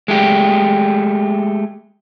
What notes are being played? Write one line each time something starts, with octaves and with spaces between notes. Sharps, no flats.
G#3 A3 G4